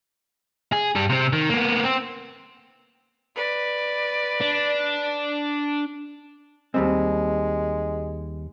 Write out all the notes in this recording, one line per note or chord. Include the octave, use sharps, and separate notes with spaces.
G#4
G2 G3
C3 C4
D#3
A#3 B3
C4
B4 D5
D4
D#2 G3 G#3 C4